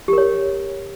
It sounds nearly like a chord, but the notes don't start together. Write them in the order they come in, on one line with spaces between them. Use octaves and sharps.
G4 A#4 C#5